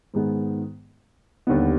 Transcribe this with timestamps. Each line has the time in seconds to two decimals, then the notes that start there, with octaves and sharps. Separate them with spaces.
0.14 G#2 D#3 G#3 B3
1.47 D#2 D3 G3 B3